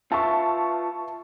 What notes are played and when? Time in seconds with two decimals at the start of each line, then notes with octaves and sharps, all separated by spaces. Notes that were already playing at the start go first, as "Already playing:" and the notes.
0.12 F4 B4 E5 A5 C#6